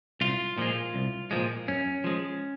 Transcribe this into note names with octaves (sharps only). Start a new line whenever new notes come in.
C2 F4
A#2 F3 G#3
C2
A#2 F3 G#3
F#2 C#4
F3 G#3